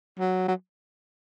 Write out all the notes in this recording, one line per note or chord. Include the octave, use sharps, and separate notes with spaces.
F#3
F#3